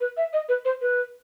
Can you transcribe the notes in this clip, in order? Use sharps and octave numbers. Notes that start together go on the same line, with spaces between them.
B4
E5
D#5
B4
C5
B4